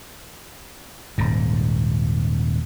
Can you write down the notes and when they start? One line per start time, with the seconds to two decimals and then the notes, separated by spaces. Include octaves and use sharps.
1.18 D#1 G#2